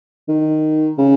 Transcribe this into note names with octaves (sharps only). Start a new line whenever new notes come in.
D#3
C#3